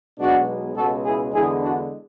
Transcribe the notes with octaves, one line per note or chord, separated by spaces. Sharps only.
B1 B2 G#3 D4 F#4
C#2 B2 G#3 F#4 A4
E4 G#4
E2 D3 G#3 E4 G#4
D4 F#4